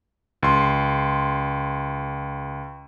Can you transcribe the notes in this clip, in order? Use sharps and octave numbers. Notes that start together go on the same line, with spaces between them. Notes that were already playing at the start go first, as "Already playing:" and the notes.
C#2 C6